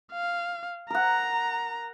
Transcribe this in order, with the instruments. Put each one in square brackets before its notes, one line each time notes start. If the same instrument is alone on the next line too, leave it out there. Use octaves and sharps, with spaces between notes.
[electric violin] F5
[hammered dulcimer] A#4 F#5 [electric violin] A#5